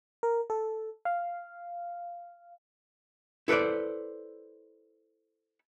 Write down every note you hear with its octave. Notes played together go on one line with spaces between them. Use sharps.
A#4
A4
F5
E4 A4 B4 C5 D5